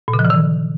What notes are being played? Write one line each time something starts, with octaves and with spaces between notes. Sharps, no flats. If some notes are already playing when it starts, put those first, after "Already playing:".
A#2
C#3
F3
E3
D#3